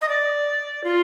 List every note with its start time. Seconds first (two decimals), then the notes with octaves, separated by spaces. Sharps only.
0.01 D#5
0.08 D5
0.84 F4